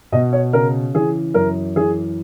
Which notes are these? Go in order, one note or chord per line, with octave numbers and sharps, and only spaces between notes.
B2 D#5
C#5
C#3 A#4
E3 G#4
F#2 A#4
E3 G#4